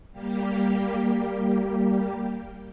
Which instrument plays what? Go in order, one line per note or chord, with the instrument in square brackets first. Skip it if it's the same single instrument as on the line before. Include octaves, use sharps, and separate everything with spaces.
[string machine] G3 A#3 G4